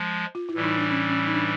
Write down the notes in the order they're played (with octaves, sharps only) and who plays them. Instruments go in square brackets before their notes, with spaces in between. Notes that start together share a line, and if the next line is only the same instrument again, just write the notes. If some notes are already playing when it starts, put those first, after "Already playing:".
Already playing: [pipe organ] F3 G#3
[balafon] F4
E4
[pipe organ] A2 E3 G3
[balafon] D#4
D4
C#4
C#4
D#4
D4